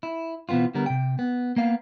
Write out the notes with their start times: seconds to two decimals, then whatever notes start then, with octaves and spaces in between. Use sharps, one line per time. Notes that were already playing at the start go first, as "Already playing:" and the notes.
0.03 E4
0.49 B2 E3 B3 C4 F4
0.75 D3 G3 B3 A#4
0.86 C3 G5
1.19 B3
1.56 A#3 B3 F5